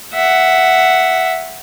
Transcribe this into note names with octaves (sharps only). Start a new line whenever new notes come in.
E5 F#5